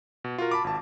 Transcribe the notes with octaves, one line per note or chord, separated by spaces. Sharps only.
B2
F4 F#4 A#4
A5 B5 D6
G#1 A5